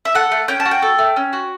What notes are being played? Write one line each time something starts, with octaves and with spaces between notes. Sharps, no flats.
E5
A4 F#5
A3
C#4 G5
A5
F#4
G5
A4
A3
C#4
F#4